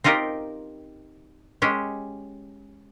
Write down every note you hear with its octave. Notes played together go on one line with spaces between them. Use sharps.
C4 D#4 F4 G4 A#4
G#3 C#4 G4